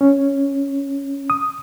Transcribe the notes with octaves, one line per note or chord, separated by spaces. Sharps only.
C#4
D#6